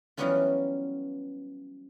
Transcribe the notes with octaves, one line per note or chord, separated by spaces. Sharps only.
E3 F#3 G3 B3 C#4 F4